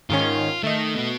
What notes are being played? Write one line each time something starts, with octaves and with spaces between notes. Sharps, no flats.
G#2 D#3 C#4 F4
D#3 A3 D#4 D#5
B3 F#4